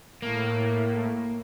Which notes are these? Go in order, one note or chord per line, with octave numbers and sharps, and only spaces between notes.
A2 A#3